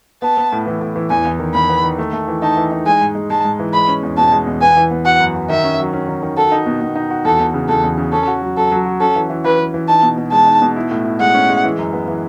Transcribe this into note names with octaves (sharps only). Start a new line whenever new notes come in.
B3 A5
B3
A2
E3
A2
E3
E2 G#5
E2
D#3
E2 B5
B3
D#3
A3
A3
E3
D#4 A5
E3
D#4
G#3 G#5
G#2
G#3
G#3 A5
G#2
E3
G#3 B5
C#4
E2
B2 A5
G#3
E2
B3 G#5
E3
B3
F#4 F#5
F#2
F#4
D#3 E5
C#4
F#3
C#4
D#3
D#3
F#4 A4
D#4
B2
B2
D#4
F#4
E2 A4
E2
C#3
E2 A4
E2
C#3
C#4 A4
F#4
F#3
F#3 A4
F#3
F#4
C#4 A4
E3
E3
E3 B4
E3
E3
D#4 A5
B2
B2
G#3 A5
D#4
B2
E4
A2
E4
G#3 F#5
C#4
G#3
E3
F#2
B3
E3